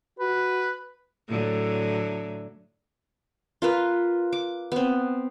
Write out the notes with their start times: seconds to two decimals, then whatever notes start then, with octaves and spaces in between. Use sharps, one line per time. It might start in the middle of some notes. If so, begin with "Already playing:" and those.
0.19 F#4 B4
1.28 A2 D3 F#3
3.62 F4 A#4 B4
4.33 D6
4.72 B3 C4